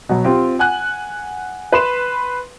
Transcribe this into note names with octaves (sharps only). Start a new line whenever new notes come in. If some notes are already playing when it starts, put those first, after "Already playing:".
B2 F#3
C4 F4 G4
F#5 G#5 F#6
B4 C6 E7